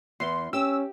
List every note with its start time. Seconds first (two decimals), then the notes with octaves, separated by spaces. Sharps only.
0.20 E2 C6
0.53 C#4 G4 E6